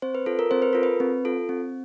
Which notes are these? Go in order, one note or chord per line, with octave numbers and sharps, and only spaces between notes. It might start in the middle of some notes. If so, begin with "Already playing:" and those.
C4 C5
B4
F4 A4
A#4
C4 C5
B4
F4 A4 A#4
B4
C4
F4 A4
C4